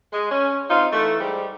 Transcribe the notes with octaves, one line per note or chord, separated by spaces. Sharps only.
G#3
C#4
C4 D#4 F4
E3 A3
G#2 G3